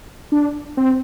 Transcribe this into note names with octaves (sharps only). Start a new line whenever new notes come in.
D4
C4